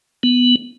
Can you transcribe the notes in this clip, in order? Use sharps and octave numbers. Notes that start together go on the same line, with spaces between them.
B3